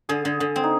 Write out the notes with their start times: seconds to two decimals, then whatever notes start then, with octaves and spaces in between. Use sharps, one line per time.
0.09 D3 G#4
0.25 D3
0.40 D3
0.56 C4
0.63 D#4